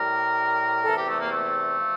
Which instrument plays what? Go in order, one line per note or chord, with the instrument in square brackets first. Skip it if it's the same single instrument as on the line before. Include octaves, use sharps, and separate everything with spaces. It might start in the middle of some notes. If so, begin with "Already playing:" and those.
Already playing: [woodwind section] A2 G3 A#4
E2 C3 E3 A4
G4
A3
A#3
A3
F3